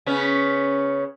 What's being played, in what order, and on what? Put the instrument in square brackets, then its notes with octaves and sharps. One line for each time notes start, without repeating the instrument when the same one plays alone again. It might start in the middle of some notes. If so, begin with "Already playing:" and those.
[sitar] C#3 B3 C#4